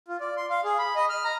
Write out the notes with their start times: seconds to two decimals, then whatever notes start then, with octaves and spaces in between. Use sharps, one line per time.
0.08 F4
0.20 D5
0.37 C6
0.50 F5
0.64 G#4
0.78 B5
0.95 D#5
1.09 F6
1.24 A#5